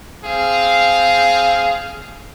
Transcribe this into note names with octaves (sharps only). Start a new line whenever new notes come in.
C4 G#4 F5